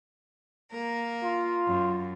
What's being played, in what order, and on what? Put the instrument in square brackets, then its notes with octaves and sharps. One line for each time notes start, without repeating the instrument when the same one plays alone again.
[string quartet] A#3 A#4
[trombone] F4
[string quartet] F#2